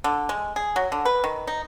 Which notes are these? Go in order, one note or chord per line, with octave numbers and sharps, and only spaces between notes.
D3
G#3
G#4
F#3
D3
B4
D#3
D#4